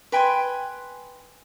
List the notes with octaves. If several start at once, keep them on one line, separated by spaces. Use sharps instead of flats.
B4 G5 G#5 C6